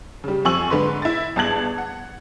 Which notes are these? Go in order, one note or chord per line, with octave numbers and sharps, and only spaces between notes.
C#3 G3
F2 F3 G#5 C#6 E6 F#7
G#2 D3 B4 C6
E4 A6
G1 G#4 A5 F#6 G#6 F#7
F#5